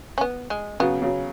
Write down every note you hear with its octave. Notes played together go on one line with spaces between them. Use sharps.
C#4
B3
G#3
C#3 F#3 B3
C#3 F#3